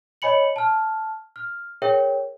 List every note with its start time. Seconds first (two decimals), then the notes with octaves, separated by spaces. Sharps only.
0.22 C#5 D#5 G#5 B5 C#7 F#7
0.56 A5 F6
1.36 F6
1.82 G#4 A#4 C#5 E5 G5